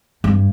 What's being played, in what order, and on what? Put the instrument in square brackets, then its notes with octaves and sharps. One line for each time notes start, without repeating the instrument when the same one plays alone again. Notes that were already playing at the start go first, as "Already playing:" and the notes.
[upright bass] G2